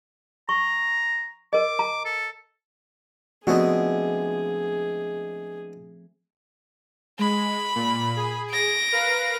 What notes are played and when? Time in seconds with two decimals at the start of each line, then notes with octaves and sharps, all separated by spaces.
0.49 A#5 C#6
1.53 A#4 D#5 D6
1.79 A#5
2.05 A4
3.47 D3 F3 G#3 A3 B3 C4 F#4 G#4
7.19 G#3 B5
7.75 A#2
8.16 G#4
8.50 A#6 D7
8.92 A#4 B4 F5